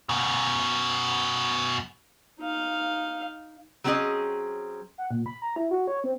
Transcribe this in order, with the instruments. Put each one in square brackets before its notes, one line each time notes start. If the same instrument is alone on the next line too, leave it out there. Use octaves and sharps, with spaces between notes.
[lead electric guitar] F#2 B2
[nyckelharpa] D#4 F5
[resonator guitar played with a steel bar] F#3 G3 C4 C#4 G#4 D#5
[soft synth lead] F#5
A#2
B5
A#5
E4
F#4
C#5
C4